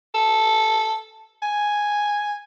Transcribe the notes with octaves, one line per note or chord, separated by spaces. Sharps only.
A4
G#5